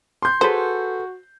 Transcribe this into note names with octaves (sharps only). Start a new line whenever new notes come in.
C6 G6
F#4 G#4 A4 B4 C5